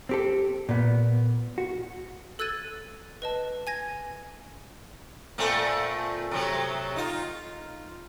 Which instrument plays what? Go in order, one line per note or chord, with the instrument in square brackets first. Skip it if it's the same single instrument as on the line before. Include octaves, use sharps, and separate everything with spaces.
[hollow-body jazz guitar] C4 G4 A4
A#2 B3
F#4
[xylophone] A4 E6 F#6 G#6 A6 D#7
B4 D#5 A5
G#5 G#6 A#6
[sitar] A#2 A3 C4
C3 F#3 A3
D#4 F4